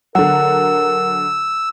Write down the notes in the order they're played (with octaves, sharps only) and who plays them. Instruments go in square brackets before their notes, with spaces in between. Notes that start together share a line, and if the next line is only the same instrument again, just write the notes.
[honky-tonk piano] D3 F#3 [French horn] A#4 [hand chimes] F#5 [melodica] E6